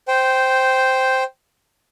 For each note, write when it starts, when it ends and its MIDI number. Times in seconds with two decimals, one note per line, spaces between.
0.08 1.23 72
0.08 1.23 79